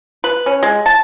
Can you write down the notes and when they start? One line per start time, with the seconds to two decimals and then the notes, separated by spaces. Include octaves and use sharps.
0.24 B4
0.46 C#4
0.63 G#3
0.86 A5